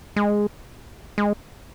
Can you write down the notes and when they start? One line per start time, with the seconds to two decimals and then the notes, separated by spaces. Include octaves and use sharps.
0.16 G#3
1.18 G#3